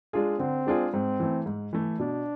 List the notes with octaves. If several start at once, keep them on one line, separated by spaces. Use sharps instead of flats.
G#3 D4 F4 G#4
D3 C4
G#3 D4 F4 G#4
G#2 C4
E3 A3
G#2
E3 A3
B2 D4